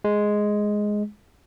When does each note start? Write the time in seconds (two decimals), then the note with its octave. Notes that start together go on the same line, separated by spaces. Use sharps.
0.04 G#3